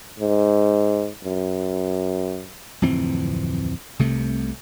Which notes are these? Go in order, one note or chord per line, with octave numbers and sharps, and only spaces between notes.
G#2
F#2
D1 F2 E3 C4
C2 C3 A3